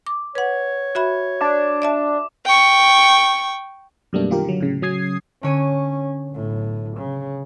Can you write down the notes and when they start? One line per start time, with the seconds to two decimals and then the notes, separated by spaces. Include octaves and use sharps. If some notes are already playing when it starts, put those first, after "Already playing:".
0.07 D6
0.35 B4 C#5 F#5
0.95 F#4 E5 B5
1.41 D4 D6
1.82 D5 E5 A5
2.46 G5 C#6
4.13 F#2 B2 G3 A3 A#3 D4
4.30 D#3 F4 G4 A#4
4.44 D3 F#3
4.60 A2 C#3
4.82 C#3 F#3 C#4 D#6 G#6 C7
5.43 D3 C#4 C#5 D#7
6.30 B1 A2
6.98 C#3